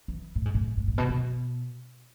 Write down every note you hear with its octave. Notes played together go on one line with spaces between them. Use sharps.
E3
A2
G#2
A2
G#2
A2
B2
B2